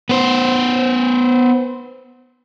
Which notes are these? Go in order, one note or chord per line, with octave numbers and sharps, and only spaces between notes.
B3 C5